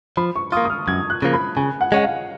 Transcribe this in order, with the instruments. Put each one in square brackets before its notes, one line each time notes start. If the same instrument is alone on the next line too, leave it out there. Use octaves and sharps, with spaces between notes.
[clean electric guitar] F3 [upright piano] B5
[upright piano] C#6
[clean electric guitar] F4 [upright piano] D#6
[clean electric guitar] A#3
[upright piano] D#6
F6
[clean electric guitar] F#2 [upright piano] G#6
[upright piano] F#6
[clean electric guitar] C#3 F3 A#3
[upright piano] B5
[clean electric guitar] C#3 [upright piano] G#5
[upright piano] F#5
[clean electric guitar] G#3 C#4 [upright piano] F#5
[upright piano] F5